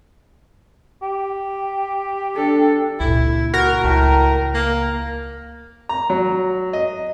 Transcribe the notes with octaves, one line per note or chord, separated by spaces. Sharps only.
G4
D4 A4
C#2 A#2 E4
F#4 A#4
C#2 A2
A#3
A#5
F#3
D#5